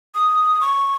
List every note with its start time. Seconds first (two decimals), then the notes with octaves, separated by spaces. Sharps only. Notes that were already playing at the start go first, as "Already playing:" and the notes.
0.15 D#6
0.61 C#6